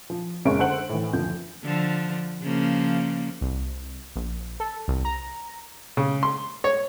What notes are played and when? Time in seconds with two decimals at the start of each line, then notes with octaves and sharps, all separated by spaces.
0.10 F3
0.45 F#1 G#3 C#4 F5 C#6 D7
0.59 D3 A4 C5 F#5 F#7
0.89 A2 E3
1.13 F#1 D2 F3 G6
1.64 D3 F3
2.43 C#3 F3 A#3
3.41 C2
4.16 A#1
4.60 A4
4.88 C2
5.05 A#5
5.97 C#3
6.23 C6
6.64 C#5